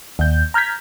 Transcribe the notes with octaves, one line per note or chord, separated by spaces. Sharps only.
D#2 G6
A#5 F6 G6 G#6 B6